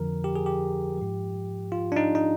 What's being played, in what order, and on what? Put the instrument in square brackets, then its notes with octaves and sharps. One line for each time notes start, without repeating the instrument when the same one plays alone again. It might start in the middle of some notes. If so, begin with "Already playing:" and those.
Already playing: [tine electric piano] F2 D3 F3 A#4
G4
G#4
G4
G#2 F3
F4
D4
D#4
D#4